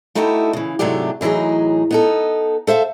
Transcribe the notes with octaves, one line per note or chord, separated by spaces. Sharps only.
A3 D#4 E4 F#4 G4 A4
C#3 E3
G#2 C3 F#3 A3 D4 G4
A2 E3 F#3 D#4 G#4
B3 D#4 A4
A4 C5 E5 F5